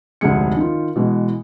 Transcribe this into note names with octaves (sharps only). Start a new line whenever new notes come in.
F1 D2 G#2 G#3 G#4 C#7
D#3 F4
B2 E3 G#3